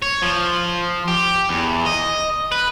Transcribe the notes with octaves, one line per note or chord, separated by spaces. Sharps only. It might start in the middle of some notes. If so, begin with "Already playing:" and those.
C#5
F3
G4
E2
D#5
B4